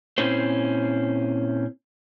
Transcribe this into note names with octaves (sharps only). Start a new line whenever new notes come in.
A#2 C4 C#4 E4 C5